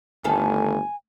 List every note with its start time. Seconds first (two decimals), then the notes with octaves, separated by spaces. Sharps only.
0.24 G1 D2 D#3 A4 G#5